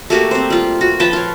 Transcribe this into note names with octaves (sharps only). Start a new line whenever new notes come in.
A3 A#3 F#4 G4
C4 C5
G3 F4
F#4
F3 B4 G5 A5
F4 C#5